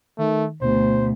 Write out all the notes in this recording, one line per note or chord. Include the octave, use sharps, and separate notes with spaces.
D#3 A3
D2 B2 C5